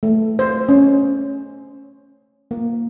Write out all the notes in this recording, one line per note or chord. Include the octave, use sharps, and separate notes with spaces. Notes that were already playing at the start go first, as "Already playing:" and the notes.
A3
C5
C#4
A#3